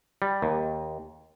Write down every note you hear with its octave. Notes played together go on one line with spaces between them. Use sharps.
G3
D#2